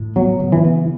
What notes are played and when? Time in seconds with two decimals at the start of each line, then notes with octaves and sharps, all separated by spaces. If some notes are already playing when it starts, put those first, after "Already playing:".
Already playing: A2
0.16 F#3 B3
0.40 C#3
0.52 E3
0.64 B3